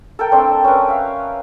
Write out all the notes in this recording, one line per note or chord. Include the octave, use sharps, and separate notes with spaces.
A4 A#4 G5
A3 C4 D4 C5
C#4 A#4 B4
E5 F5